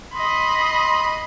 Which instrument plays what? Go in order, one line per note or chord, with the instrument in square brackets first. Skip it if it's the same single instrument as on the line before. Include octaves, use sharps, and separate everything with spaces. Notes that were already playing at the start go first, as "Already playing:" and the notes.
[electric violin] D#5 B5 [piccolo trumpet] C6